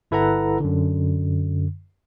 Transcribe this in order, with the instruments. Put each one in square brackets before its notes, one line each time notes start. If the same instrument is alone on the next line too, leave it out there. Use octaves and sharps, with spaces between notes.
[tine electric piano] G1 E4 A4 B4 F#5 A#5
F#2 D3